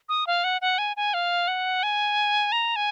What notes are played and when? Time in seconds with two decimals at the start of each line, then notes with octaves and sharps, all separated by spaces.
0.09 D#6
0.27 F5
0.44 F#5
0.61 F#5
0.78 G#5
0.97 G#5
1.14 F5
1.48 F#5
1.83 G#5
2.52 A#5
2.76 G#5